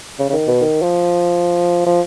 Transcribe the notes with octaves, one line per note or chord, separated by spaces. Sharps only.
C#3
C#3
D#3
B2
D#3
F3
F3